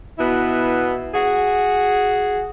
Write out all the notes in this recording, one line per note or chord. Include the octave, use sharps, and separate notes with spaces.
B2 B3 E4
F#4 G#4